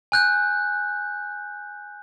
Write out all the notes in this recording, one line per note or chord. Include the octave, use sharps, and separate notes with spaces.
G#5 F#6 G6